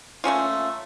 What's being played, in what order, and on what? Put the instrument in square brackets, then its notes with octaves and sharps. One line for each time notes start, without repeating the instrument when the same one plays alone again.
[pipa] A3 A#3 C#4 F4